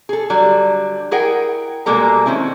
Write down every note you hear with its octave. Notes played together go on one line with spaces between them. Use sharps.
G#4 A4
D3 F#3 G3
E4 G#4 A#4 F#5 G5
B2 G3 G#3 A#3 A4 A#5
D#3 C4 C#4 E4